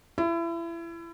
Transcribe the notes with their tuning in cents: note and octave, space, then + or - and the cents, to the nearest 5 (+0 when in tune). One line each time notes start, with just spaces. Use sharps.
E4 +30